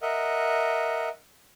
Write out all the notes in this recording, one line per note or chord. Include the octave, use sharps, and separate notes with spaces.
A#4 D#5 E5 F#5